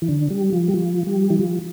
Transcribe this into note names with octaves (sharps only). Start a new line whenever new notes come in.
E3
D3
G3
F3
G3
F3
G3
E3
F3